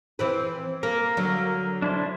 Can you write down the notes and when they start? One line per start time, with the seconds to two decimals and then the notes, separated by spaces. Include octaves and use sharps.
0.19 E3 C4 B4
0.83 A#3 A#4
1.17 D3 F#3
1.82 D4 E4 C5